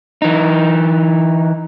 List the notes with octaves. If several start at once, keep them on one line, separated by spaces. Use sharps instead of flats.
E3 D#4